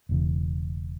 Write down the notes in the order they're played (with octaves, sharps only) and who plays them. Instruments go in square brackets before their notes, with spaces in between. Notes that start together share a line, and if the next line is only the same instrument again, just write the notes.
[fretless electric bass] E1 E2 C#3 E3